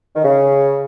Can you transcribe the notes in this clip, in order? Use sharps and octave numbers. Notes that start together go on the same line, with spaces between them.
D#3
C#3